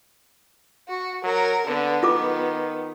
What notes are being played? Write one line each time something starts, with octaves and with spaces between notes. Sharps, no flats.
F#4
F#3 A#4
D3 B3
D#3 F4 A4 D6